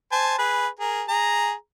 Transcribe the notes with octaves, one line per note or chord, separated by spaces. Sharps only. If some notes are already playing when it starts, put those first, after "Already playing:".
C5 G#5 A5
G#4 B4
G#4 A#4
G#4 A#5